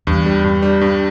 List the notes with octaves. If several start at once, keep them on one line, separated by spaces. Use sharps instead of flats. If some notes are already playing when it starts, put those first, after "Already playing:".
E2 G2
G3
G2
G3
G2